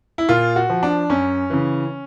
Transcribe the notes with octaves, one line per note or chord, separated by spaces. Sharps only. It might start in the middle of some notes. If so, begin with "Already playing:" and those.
E4
A#2 F4
F#4
F3
D4
F#2 C#4
C#3 E3